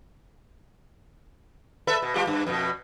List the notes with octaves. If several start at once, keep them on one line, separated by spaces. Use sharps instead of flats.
A4 B4 E5
B2
G3 F4 G4
G2
F2 B2